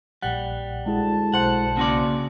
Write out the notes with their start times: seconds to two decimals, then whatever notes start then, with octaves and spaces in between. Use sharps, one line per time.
0.22 A#1 G3 F#5
0.86 D2 G#3 E4 G#4 A5
1.34 B1 C5 F#5 C#7
1.77 C#3 A#3 F#4 D5 C6